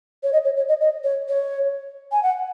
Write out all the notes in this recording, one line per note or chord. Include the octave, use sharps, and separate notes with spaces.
C#5
D#5
C#5
C#5
D#5
D#5
C#5
C#5
G#5
F#5